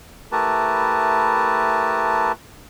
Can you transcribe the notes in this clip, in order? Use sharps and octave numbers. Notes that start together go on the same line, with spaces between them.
A3 E4 G4 A#4 B4 A5